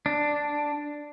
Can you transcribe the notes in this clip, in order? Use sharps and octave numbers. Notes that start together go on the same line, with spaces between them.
D4